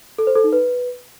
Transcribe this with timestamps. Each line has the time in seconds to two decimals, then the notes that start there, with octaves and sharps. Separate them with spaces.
0.18 A4
0.27 C5
0.36 A4
0.44 D#4
0.53 B4